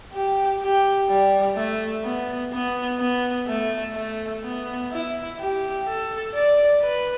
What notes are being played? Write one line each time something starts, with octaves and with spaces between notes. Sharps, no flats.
G4
G4
G3
A3
B3
B3
B3
A3
A3
B3
E4
G4
A4
D5
B4